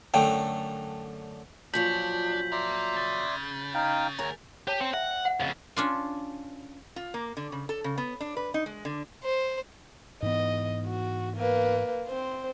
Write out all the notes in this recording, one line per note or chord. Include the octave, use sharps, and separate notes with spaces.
F#2 D3 A3 G5
A#2 F3 F#3 D4 G6 B6 F#7
A#3 A#4 D5 E5 C6
C#3 A6
D#4 F5 G5
D2 G#4 A#4 C#5 A#5
G4 C#5 A5
C4 C5 G5
E5 F#5
F#5
F2 C#3 D#5 F5
C#4 D4 F4
F4
A#3
D3
C#3
A4
C#3
B3
D4
B4
D#4
G#3
D3
C5
G#2 E3 B3 D#5
F#4
A#3 B4
C4 C5